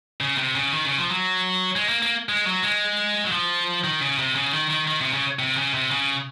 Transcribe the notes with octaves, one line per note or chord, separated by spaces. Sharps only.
C#3
C3
C#3
D#3
C#3
F3
F#3
G#3
A#3
A#3
G#3
F#3
G#3
F#3
F3
D#3
C#3
C3
C#3
D#3
D#3
D#3
C3
C#3
C3
C#3
C3
C#3